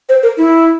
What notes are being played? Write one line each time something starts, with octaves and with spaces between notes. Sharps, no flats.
C5
A#4
E4